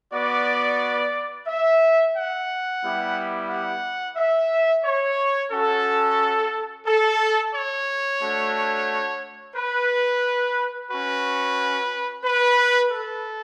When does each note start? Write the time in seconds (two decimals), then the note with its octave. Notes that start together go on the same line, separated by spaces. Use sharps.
0.12 B3 F#4 D5
1.47 E5
2.15 F#5
2.82 G3 B3 E4 G4
3.49 F#5
4.17 E5
4.84 C#5
5.51 C#4 F#4 A4
6.86 A4
7.53 C#5
8.21 A3 D4 F#4
9.55 B4
10.90 C#4 F#4 B4
12.24 B4
12.91 A4